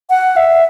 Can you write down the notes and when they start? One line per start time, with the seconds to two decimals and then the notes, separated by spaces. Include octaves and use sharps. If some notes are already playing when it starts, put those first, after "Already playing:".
0.10 F#5
0.36 E5